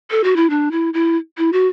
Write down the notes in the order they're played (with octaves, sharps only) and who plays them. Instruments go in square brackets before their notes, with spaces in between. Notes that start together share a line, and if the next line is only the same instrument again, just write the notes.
[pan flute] A4
F#4
E4
D4
E4
E4
E4
F#4